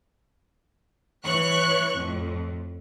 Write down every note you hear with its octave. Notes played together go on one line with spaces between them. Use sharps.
E3 C#5 C#6 F#6
F2 A2